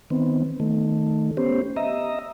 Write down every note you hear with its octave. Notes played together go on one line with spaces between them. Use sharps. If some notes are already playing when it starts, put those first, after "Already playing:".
D#3 B3 C4
D#3 A3
B3 C#4 G4 C5
D#5 E5 A#5